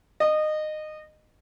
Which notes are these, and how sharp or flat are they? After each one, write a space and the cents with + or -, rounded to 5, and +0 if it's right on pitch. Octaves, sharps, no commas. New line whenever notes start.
D#5 -20